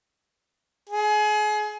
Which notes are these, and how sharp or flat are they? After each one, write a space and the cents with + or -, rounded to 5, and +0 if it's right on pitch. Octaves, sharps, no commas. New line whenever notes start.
G#4 +30